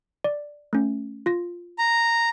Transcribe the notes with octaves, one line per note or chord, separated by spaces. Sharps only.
D5
A3 C#4
F4 A#6
A#5